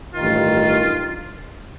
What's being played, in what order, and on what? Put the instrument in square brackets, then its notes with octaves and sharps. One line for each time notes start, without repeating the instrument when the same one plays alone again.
[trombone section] A1 G2 D#3 [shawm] F4